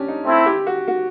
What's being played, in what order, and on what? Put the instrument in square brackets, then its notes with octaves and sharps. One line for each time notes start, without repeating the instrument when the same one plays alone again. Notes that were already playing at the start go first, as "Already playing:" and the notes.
Already playing: [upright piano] C#4 D4 G4
D#4
[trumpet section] A3 C4 E4
[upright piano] G4
F#4
F#4